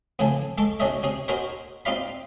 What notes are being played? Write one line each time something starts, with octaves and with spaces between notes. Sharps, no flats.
F2 A2 C#3 E3 G#5 A5
G#3 A4 A5 C#6 D6
B1 C#4 D4 C#5 D#5 E5
C3 C#4 G#4
D#4 F#4 G#4 A#4 C5 C#5
C4 D#4 F4 D5 F5 B5